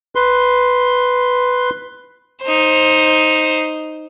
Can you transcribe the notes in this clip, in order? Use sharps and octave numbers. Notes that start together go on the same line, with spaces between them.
B4 C6
D#4 C5